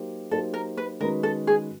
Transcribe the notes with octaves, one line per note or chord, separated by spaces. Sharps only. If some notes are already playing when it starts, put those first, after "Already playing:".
Already playing: F#3 A#3 D#4 G4 C5
F#3 A#3 D#4 G4 A4 C5
A#4
B4
D#3 G#3 C#4 F#4 A#4 B4
A4
G#4